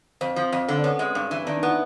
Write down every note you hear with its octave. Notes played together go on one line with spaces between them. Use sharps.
F2 C4
F3
F2
D3
D4
B3 C#4
G#3
G2
E3
D#3 D4
D#4
B3
E4